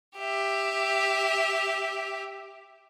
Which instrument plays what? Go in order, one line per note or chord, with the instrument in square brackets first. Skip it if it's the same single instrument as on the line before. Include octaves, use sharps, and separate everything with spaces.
[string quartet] G4 E5